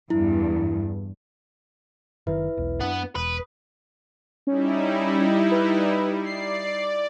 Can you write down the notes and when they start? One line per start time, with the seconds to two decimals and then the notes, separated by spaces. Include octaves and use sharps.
0.10 E2 G2 E4
2.27 F#1 D#3 E4 B4 E5
2.57 E1 B1
2.81 F#2 B3 D4
3.16 E1 B4 D#6
4.47 G3 C#4 D#4 E4
5.51 B4
6.25 D5 C7